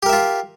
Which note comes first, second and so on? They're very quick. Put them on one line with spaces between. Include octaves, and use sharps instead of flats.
G4 A#4 E5 F4